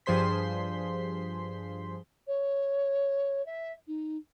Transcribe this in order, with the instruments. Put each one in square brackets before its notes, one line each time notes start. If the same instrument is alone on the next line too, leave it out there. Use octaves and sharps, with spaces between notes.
[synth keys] G2 F3 G#4 C5 C6 B6
[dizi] C#5
E5
D#4